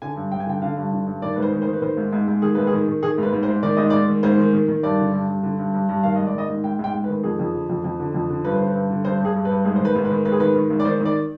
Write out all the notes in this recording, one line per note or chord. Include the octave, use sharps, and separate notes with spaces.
D3 G#5
G2
G2 G5
G#5
D3 G5
D3 F5
G2
D3
G2
D#3 D5
G#2 B4
C5
D#3
C5
D#3
B4
D#3 C5
G#2
G#2
G#2
D#3 G#4
G#2 B4
G#4
D#3
D#3
D#3 G#4
G#2 B4
G#2
C5
G#2
D#3 D5
G#2 D#5
G#2 D5
D#3
G#2 C5
D#3
D#3
D#3
G2 D5
D3
G2
G2
D3
G2
G2
G2
D#3 F5
G#2 D#5
D5
D#3 D#5
G#2
G#2 G5
G#2
G5
G#2
B4
D#3
F2 G#4
F2
D3
F2
F2
D3
F2
D3
G2 B4
D3 C5
B4
G2
D3
G2 C5
G2 G#4
G2
B4
G2
G#2 G#4
C5
D#3
B4
G#2
B4
D#3
G#2 B4
G#4
D#3 B4
D#3
G#2
D5
D#3 C5
D#3
D5